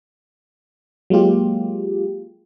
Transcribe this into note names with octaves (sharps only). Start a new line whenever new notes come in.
F#3 G#3 A#3 F4 G4